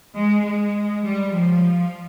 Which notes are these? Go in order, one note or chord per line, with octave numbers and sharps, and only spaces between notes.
G#3
G#3
G3
F3